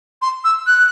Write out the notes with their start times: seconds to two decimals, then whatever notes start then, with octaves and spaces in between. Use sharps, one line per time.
0.22 C6
0.44 E6
0.67 F#6